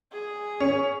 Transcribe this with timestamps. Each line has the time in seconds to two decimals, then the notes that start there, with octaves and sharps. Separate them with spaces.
0.12 G#4
0.60 C#4